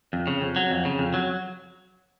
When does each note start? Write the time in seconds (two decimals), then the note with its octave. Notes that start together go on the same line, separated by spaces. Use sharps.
0.13 F2
0.27 C#3
0.41 F2
0.56 F#3
0.70 F2
0.85 C#3
0.99 F2
1.14 F#3